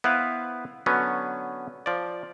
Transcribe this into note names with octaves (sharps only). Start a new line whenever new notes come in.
B3 E4 B4 C5 F5
D3 F#3 B3 C#4
F3 D5